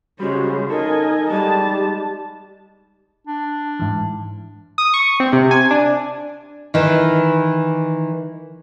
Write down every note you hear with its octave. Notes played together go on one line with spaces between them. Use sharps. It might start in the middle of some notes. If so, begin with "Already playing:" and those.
C#3 G3 G#3 C#4 F#4 C5
D#4 A4 A#4 D#5 G#5
G3 G#3 D#4 G4 A5
D4
G#2 E3
D#6
C#6
C4
C3
G#5
D4
D#3 E3